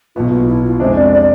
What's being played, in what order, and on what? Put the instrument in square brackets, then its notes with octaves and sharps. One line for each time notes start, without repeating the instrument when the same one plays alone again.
[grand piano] B1 B2 B3 [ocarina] F4
[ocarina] F4
E4
F4
[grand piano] F2 C3 G#3 D4 [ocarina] C5
[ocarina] D5
D5